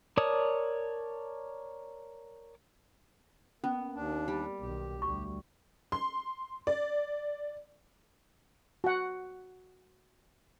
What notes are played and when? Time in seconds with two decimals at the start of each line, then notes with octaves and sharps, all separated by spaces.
0.17 A#4 C#5 D5 A5 D#6
3.64 A#3 B3 C#4
3.95 D#2 D4
4.28 G3
4.60 B1 D#3 G4
5.02 D2 G3 C#6
5.92 C6
6.67 D5
8.84 F#4 F#5